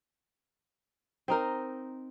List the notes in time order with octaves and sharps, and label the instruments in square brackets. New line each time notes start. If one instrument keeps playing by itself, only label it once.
[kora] C4 D#4 A#4